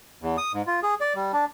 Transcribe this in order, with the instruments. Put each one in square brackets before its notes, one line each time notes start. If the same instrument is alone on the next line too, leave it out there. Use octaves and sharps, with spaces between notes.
[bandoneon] E2
D#6
G#2
F4
G#4
D5
G3
D4